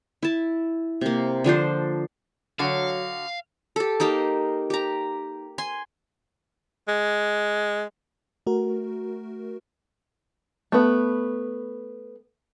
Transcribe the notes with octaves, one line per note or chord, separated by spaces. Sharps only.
E4 A5
C3 A#3
D3 F3 D4 C5
D3 F#3 F#4 F5
G4 A4
A#3 D#4 G4 A#4
G4 A#5
G#5 C6
G#3
A3 F#4 A#4
A3 B3